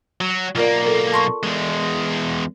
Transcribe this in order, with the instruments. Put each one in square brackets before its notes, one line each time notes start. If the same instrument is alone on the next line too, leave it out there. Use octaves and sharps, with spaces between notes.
[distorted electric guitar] F#3
[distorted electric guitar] B1 A#3 [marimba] F4 A#4 D5
[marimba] A4 A#4
A5 C6 C#6
[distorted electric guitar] E2 G#3